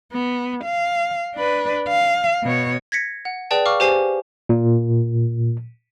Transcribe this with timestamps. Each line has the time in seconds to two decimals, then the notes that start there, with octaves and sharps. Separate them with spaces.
0.13 B3
0.65 F5
1.36 D4 B4
1.88 F5
2.43 B2 C#5
2.92 G#6 A#6 B6 C#7
3.25 F#5
3.51 G#4 B4 D5 G5 A5
3.66 F5 C#6 D6 F6
3.80 G4 C5 G#5 C7 E7
4.49 A#2